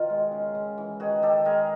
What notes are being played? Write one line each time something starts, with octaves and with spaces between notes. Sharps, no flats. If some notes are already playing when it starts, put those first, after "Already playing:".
Already playing: B2 D#3 F4
G#3
C#3
C#3
E3
D#3 F#4 G#4
D#3 G4 A4
G#3 G#4 A#4